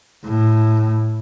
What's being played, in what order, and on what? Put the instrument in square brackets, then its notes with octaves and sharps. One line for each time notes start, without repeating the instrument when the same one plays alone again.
[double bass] A2